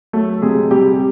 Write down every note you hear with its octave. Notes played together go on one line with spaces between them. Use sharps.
F#3 A3 A4
C3 G#3 G#4
C3 G3 G4